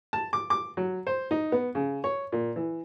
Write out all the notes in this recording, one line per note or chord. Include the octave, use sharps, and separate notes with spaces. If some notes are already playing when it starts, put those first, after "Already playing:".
A5
D6
D6
F#3
C5
D#4
B3
C#3
C#5
A#2
E3